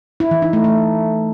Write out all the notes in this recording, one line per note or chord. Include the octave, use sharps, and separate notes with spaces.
E4
E3
D#4
A3
A3